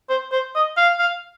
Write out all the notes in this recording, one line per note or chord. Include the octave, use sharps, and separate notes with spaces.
C5
C5
D#5
F5
F5